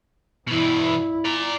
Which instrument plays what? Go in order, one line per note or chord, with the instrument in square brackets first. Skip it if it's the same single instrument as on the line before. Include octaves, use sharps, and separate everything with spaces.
[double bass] G2 E4 [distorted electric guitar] B2 E3
[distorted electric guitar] D5 A#5